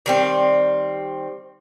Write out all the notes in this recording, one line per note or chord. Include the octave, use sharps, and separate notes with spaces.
D#3 G3 C4